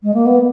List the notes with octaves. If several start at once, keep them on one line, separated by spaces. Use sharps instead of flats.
G#3
A#3
B3